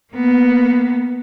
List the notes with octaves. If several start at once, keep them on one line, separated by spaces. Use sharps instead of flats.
A#3 B3